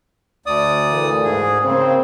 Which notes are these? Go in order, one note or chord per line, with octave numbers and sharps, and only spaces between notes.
D2 D5 D#6
A#2 E3 A3
G#2 G#4
C#3 A#3 C4